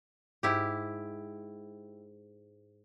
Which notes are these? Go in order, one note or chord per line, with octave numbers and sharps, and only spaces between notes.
G#2 E4 G4